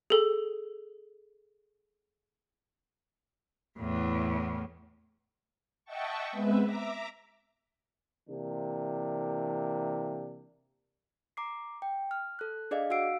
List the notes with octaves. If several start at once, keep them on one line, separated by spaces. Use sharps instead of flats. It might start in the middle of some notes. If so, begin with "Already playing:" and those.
G#4 A4
E2 A2
D#5 E5 F#5 G5 A5 C#6
G#3 B3 C4 B4 E5
E5 A#5 D6
C3 E3 A#3 D4
A#5 D6 C7
G5
F6
A4 F#6
D4 G#4 D5 D#5 F5
F#4 F5 F#5 E6 C7 D7